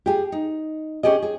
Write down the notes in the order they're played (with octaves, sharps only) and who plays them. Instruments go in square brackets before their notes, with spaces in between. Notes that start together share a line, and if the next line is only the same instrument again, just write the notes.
[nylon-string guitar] G4 G#4
D#4
C#4 G4 G#4 D#5
G#4